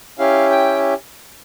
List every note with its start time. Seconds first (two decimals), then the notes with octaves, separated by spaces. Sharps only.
0.19 C#4 E4 G4 F5
0.50 G5